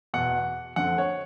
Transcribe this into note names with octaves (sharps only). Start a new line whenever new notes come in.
E2 B2 F#5
F2 D3 F#5
C#5